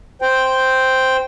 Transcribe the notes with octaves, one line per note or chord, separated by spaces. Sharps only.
C5 G5